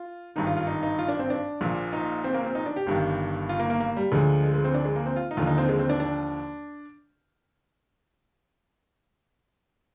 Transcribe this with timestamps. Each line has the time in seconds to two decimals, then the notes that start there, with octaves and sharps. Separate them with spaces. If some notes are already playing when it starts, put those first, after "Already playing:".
Already playing: F4
0.36 G#1 G2 D#3 D#4
0.46 F4
0.57 F4
0.67 D#4
0.83 D#4
0.99 F4
1.08 D4
1.19 C4
1.30 D4
1.61 A#1 A#2 F3
1.93 D#4
2.24 C4
2.34 A#3
2.45 C4
2.55 D#4
2.66 D4
2.76 G4
2.87 G1 G2 D#3
3.49 F4
3.60 A#3
3.70 A#3
3.80 A#3
3.97 G3
4.12 D2 D3 F3 G#3
4.43 G#3
4.54 G#3
4.64 C4
4.74 D4
4.85 G#3
4.96 A#3
5.06 C4
5.16 F4
5.31 D#4
5.37 D#2 D3 F3 F4
5.47 D#4
5.58 C4
5.69 G#3
5.79 C4
5.90 D4
6.00 D4